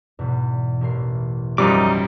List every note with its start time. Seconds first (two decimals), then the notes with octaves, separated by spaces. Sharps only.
0.19 E2 G#2 B2
0.81 A1 A#4 C7
1.58 F#2 F3 G3 D#4 D6